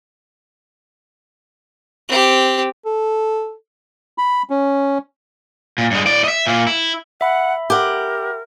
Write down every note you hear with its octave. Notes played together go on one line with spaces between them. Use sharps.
C4 G4
A4
B5
C#4
A#2
G2 G#3
A2 D5
D#5 E5
A#2 A#3
E4
E5 F#5 B5
G4 A#4 F#5